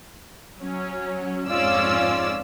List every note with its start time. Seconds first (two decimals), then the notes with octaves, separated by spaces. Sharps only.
0.60 F#3 C#4
1.48 F2 G#2 C#4 F4 D5 E6